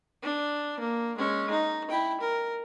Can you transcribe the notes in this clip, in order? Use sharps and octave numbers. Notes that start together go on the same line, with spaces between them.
D4
A#3
G#3 C#4
D#4
E4 G5
A#4